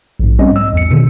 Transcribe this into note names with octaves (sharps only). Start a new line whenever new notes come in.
A#1 G#2
G3 C4 C#4 D#5
E6
E2 C#7
B2 D3 D#3